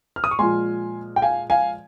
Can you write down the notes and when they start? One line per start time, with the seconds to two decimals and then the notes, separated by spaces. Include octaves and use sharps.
0.16 F6
0.24 D#6
0.31 C#6
0.39 A#2 F3 G#3 G#5 C6
1.16 G5
1.22 F5 G#5
1.50 F5 G#5